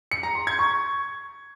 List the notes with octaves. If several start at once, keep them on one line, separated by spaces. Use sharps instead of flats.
C#7
A#5
C6
G#6
C#6